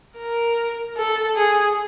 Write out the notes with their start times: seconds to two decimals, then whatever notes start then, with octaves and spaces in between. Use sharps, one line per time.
0.18 A#4
0.97 A4
1.36 G#4